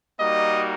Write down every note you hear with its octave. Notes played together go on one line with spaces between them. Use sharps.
G3 A#3 D#4 F#4 D#5